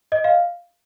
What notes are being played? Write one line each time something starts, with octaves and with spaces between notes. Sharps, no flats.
D#5
F5